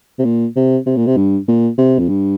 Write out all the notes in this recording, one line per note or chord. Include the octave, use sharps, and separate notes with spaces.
C3
A#2
C3
C3
A#2
C3
G2
A#2
C3
F2
G2